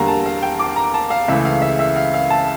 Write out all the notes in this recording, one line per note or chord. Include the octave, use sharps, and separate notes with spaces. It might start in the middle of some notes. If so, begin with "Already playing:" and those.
Already playing: E2 D3 G3 A#3 A#5
A5
F5
G5
D6
A#5
A5
F5
C#2 C#3 E3 A3 E5
F5
E5
E5
F5
F5
A5